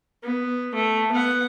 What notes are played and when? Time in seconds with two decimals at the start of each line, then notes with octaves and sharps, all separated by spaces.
0.23 B3
0.75 A3
1.12 B3 F#5